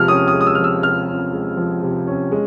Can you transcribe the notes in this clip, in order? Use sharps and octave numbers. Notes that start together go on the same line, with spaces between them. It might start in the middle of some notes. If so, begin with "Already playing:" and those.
Already playing: C3 F3 G#3 F6
C#4 D#6
D#6
G#3
D#6
E6
F3 F6
E6
C3 F6
C#4
G#3
F3
C3
C#4
G#3